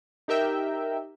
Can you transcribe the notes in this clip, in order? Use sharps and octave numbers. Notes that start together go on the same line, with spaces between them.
D#4 G4 A#4 E5 G5